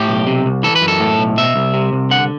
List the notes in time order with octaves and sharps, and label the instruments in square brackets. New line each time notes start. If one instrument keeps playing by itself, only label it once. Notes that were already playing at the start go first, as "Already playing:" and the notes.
Already playing: [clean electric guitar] A2 G4
B1
C3
C2
E3 A4
B4
F#2
A4
A2
B1
B2 E5
C2
C3
C2
D3 F#5